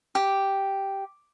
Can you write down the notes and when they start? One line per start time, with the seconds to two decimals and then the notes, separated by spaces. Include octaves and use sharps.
0.15 G4